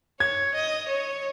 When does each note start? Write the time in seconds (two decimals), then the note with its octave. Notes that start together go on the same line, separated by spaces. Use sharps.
0.20 C#5 G#6
0.55 D#5
0.88 C#5